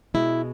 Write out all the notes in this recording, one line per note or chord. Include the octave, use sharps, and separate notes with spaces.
B2 G#3 E4